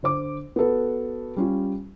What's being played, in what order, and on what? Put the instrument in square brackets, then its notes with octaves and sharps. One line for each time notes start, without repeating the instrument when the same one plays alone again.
[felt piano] D3 C5 D6
B3 F#4 A4 B4
G3 C#4 F4